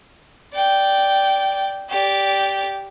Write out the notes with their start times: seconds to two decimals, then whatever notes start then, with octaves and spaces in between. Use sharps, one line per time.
0.54 D5 G5
1.89 G4 D5